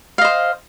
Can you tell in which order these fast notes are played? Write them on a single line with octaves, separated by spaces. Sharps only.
F5 D#5 C5